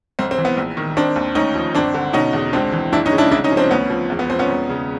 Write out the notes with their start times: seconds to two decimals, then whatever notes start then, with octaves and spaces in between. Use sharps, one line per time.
0.19 B1 C4
0.31 C4
0.38 E3
0.45 B3
0.57 A#1
0.77 D#3
0.97 D#3 C4 D4
1.16 D#2
1.35 D2 C#4 D#4
1.55 F3
1.75 G1 C4 D4
1.94 D3
2.13 B2 C#4 D#4
2.33 E2
2.53 C#2 C4 D4
2.72 E3
2.92 F#1 D4 E4
3.06 C#4 D#4
3.13 C#3
3.18 D4 E4
3.31 C2 D4 E4
3.44 C#4 D#4
3.51 F3
3.57 C4 D4
3.71 D2 B3 C#4
3.90 F3
4.10 E2
4.19 B3
4.29 F3 C4
4.39 B3 C#4
4.49 E1
4.69 C#3